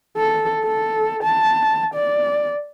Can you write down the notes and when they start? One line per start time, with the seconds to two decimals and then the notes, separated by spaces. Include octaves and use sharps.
0.17 A4
0.64 A4
1.23 A5
1.94 D5